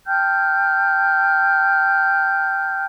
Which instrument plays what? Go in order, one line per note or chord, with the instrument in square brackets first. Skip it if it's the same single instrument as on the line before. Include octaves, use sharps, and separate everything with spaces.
[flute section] G5 A5 F6 G6